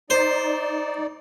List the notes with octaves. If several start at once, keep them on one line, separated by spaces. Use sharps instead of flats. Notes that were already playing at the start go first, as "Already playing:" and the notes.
D#4 C5 D5